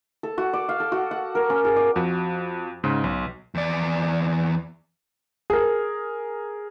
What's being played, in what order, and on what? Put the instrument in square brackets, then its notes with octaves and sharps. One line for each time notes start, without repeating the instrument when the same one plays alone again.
[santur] A4
F#4
D5
F5
A4
F#4
F#5
A#4
C#4
G#4
D5
[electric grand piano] F2 F#4
G#2 C#3
B1
[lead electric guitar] E2 D5
[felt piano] G#4 A#4